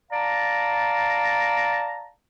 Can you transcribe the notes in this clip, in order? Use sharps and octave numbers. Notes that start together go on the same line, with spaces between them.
D5 F5 A5 A#5